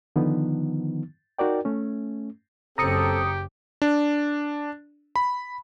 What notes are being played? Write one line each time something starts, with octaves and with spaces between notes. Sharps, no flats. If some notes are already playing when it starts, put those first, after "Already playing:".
D3 D#3 F3 B3 D#4
D#4 F#4 A#4 D5 G5
A3 C#4
F#1 C4 G4 A4 A#5 D#6 C#7
D4
B5